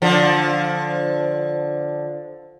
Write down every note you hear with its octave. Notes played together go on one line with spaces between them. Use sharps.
D3 F3